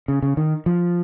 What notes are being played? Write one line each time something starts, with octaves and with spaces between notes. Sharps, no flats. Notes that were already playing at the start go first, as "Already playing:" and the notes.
C#3
C#3
D#3
F3